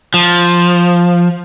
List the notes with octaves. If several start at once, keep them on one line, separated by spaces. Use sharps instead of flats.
F3